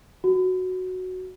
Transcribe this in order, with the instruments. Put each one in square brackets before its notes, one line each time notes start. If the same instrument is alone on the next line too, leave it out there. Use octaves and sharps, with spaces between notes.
[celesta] F#4